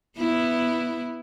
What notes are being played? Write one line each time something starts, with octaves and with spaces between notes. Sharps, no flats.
B3 E4